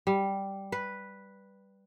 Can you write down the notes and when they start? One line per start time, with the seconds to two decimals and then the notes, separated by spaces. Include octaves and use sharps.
0.07 G3
0.72 B4